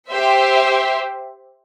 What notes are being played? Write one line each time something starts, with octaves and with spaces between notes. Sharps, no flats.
G4 C5 E5